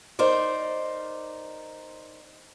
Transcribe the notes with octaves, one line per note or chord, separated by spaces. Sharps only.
D#4 A#4 C5 D5